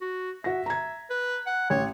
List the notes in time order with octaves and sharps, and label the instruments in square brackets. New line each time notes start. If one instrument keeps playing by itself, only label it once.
[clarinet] F#4
[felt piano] F#4 A#6 [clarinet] E5
[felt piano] A#5 G#6
[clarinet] B4
F#5
[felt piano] A1 [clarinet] C#5